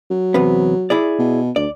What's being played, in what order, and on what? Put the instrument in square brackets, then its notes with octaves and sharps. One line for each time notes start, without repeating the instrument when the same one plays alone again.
[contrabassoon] F#3
[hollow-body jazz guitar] E2 C3 B3
E4 G#4 D5
[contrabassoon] B2
[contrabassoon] D2 [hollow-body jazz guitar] D5